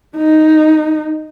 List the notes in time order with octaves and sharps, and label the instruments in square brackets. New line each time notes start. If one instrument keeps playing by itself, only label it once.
[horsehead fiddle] D#4